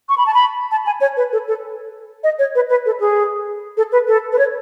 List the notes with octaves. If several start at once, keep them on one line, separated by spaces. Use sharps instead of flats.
C#6
B5
A5
B5
A5
G#5
C#5
B4
A4
A4
D#5
C#5
B4
B4
A4
G#4
A4
B4
A4
B4
C#5